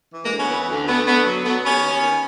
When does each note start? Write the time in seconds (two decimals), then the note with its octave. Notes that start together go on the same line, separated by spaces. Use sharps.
0.12 E3
0.24 G#3 A#3
0.31 D2
0.37 B3 C#4
0.50 E3
0.69 D2
0.87 D3 A3 B3
1.06 D3 A3 B3
1.26 F#3
1.45 F#3 A3 B3
1.64 D#2 B3 C#4
1.83 D#2
2.02 D#3